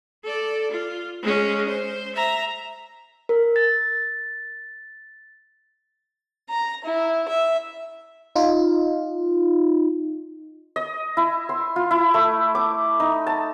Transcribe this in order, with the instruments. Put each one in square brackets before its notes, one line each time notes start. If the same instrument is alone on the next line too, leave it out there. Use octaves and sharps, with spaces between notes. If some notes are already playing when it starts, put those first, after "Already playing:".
[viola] A4 D5
F4
G#3 C#4
C5
E5 A#5
[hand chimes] A#4
A6
[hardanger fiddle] A#5
E4
E5
[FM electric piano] D#4 F4
[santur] D#5
E4
C6
F4
E4
A3
D6
D#4
A5